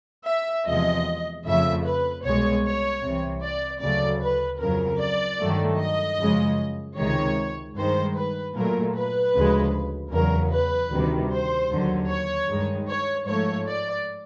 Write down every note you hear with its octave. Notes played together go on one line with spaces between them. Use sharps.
E5
E2 C3 F3 G#3 D#5
F2 C#3 F3 A3 E5
B4
C2 B2 G#3 C#5
C#5
C2 C3 E3
D5
D2 C#3 F#3 A3 D5
B4
F2 C#3 F#3 A#4
D5
G2 D#3 F#3 A3
D#5
F#2 C#3 F3 G#3
C#2 C3 D#3 G#3 C#5
G2 D#3 G#3 C5
B4
A#2 F#3 A3 A#4
B4
D2 C#3 F3 G#3
E2 C#3 F#3 A#4
B4
D2 C3 D#3 G3
C5
D#2 D3 F#3
C#5
G2 D#3 G#3
C#5
G#2 F3 A3 C#5
D5